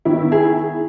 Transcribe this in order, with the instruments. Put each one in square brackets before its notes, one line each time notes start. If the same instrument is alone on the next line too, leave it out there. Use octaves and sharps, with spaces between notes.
[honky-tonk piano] D#3 B3 E4
[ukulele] G#4